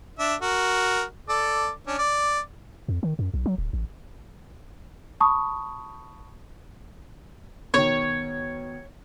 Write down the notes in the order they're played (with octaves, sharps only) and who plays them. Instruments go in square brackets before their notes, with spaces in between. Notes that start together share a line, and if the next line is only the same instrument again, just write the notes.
[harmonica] D4 E5
F#4 A#4
A4 D5
C#4 D4
D5
[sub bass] F2
D#3
F#2
B1
F#3
D1
A1
[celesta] A5 B5 C#6 D#6
[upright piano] B2 D#3 [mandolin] C#5